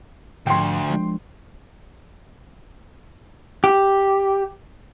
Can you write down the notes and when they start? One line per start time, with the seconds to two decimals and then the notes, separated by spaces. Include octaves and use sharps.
0.47 D2 G#2 F3 G5 C6
0.90 F3 G#3 D4
3.64 G4